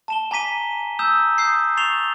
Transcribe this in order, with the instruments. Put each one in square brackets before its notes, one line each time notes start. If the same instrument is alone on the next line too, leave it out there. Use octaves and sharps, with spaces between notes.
[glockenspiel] A5 E7 G7
G#5 A#5 D6 B6 D#7 G7
A#5 D#6 E6 G6 E7
D#6 G6 C7
C#6 A6 C7 E7 F7 G7